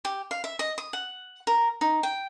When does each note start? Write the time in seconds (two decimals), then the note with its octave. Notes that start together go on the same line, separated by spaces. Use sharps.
0.05 G4
0.31 F5
0.44 E5
0.59 D#5
0.78 D#6
0.93 F#5
1.47 A#4
1.81 D#4
2.03 G5